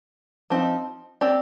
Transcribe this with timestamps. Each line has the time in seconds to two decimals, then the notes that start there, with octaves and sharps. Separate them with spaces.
0.50 F3 C4 D#4
1.21 C4 G4 D5